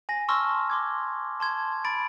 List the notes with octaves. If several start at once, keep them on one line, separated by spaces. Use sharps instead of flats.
G#5 A#6
A5 C6 C#6 E6 F6 A#6
C6 D6 G#6
A5 C6 G#6
B5 A6 D7